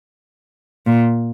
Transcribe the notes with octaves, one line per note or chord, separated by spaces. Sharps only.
A#2